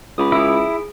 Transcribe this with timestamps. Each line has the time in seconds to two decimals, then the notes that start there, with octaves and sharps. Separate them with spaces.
0.18 C#2 B5 D6 D#6
0.32 E4 G#4 D7